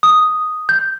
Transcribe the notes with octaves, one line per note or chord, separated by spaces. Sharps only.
D#6
G6